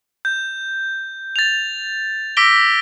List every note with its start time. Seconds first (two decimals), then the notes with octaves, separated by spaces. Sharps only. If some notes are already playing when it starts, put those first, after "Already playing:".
0.25 G6
1.36 A6 F7
2.37 D6 E6 A#6 B6 D7 G7